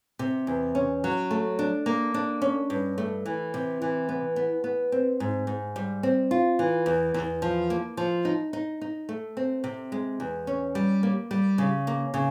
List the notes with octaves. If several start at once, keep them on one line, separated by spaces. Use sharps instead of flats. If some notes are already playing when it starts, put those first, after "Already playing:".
C3
E2
C#4
F#3
A3
D4
A#3
D4
C#4
G2
A3
E3
C3
E3
B3
B3
B3
C4
G#2
G#2
G3
C4
F4
E3
E2
E2
F3
A#3
F3
D#4
D#4
D#4
A3
C4
C3
G#3
E2
C#4
G3
A#3
G3
C#3
A#3
C#3